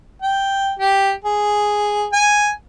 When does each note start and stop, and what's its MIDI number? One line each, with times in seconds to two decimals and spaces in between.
0.22 0.72 79
0.79 1.11 67
1.24 2.06 68
2.13 2.50 80